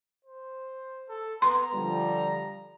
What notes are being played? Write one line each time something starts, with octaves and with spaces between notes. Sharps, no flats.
C5
A4
B3 A#5 C6
D3 F3 G3